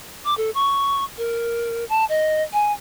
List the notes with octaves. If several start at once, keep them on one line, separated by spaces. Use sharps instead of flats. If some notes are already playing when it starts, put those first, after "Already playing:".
D6
A4
C#6
A#4
A5
D#5
G#5